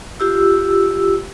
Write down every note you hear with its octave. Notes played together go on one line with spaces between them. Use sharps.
F4 G4 E6